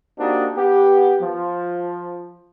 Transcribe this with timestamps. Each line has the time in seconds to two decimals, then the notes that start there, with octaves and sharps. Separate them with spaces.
0.18 A#3 C4 D4 D#4 F#4 G4
0.55 B3 G4
1.21 F3